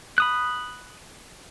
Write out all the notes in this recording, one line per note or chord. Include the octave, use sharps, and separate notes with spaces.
B5 D#6 F#6